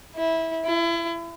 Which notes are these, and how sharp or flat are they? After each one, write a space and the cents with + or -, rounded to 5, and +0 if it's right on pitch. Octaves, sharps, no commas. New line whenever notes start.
E4 -15
E4 +35